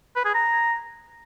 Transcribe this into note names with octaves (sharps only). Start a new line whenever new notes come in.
B4
G#4
A#5